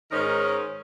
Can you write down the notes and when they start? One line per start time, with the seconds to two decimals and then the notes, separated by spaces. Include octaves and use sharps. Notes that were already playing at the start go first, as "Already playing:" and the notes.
0.12 G#2 D#3 C#4 D#4 A#4